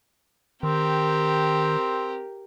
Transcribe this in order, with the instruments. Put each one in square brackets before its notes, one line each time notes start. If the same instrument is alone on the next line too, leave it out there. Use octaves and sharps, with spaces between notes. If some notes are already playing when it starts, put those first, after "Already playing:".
[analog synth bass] D#3 [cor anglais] C4 [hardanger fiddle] G4 A#4